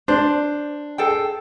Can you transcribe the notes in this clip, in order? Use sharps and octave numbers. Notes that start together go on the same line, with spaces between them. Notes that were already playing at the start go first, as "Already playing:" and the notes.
D4 C5
G#4 A4 G5